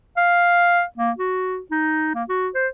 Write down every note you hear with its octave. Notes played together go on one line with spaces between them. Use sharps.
F5
A#3
F#4
D#4
A#3
F#4
C5